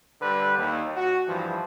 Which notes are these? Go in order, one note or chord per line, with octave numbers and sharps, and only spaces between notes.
D3 G3 B4
D#2
F#4
G2 E3 F3